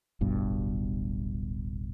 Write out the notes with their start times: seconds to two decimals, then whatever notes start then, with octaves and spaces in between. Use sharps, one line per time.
0.21 D1 G1 G2 B2